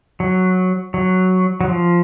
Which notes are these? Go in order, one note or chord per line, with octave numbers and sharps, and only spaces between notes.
F#3
F#3
F#3
F3